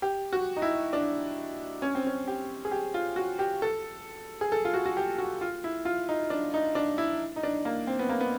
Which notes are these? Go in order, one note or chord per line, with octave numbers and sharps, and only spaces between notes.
G4
F#4
D#4
E4
D4
C#4
C4
C#4
G4
G#4
G4
F4
F#4
G4
A4
G#4
A4
F4
F#4
F#4
G4
F#4
F4
E4
F4
D#4
D4
D#4
D4
E4
D#4
D4
A#3
C4
B3
A#3
B3